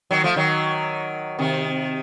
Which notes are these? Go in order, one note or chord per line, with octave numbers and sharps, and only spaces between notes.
D#3 F#3
F3 A3
D#3 F#3
C3 D#3